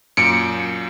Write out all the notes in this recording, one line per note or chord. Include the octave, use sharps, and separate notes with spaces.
F#2 A#2 C#7 D7